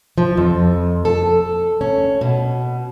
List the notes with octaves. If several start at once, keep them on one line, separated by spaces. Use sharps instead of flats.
F3
F2
A4
C#4
B2